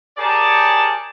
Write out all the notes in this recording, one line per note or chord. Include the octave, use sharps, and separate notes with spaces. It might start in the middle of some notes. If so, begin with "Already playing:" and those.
G4 G#4 A#4 C#5 D5 A5